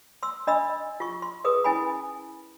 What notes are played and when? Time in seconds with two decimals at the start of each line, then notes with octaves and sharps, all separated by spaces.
0.23 C6 E6
0.47 D4 D#5 B5 E6
1.00 F4 C#6
1.22 C6
1.44 G#4 A#4 B4 D#6
1.64 C#4 E4 G#5 B5